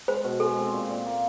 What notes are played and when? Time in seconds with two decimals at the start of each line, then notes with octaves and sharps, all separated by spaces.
0.08 G#3 C5
0.24 B2
0.40 G#3 A4
0.57 C4
0.72 A#2
0.90 A#2
1.05 A#3